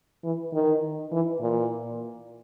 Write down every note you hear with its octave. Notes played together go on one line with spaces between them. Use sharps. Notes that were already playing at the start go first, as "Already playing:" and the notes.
E3
D#3
E3
A#2